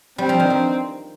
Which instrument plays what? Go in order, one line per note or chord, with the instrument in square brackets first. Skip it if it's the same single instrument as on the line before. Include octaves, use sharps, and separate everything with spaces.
[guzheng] G3 [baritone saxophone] C4
[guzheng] F3
D#3
D#3